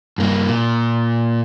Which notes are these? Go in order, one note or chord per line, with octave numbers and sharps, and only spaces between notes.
G2 A#3
A#2